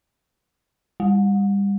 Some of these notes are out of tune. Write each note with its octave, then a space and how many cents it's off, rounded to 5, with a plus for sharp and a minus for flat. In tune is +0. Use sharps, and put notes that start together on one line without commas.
G3 +30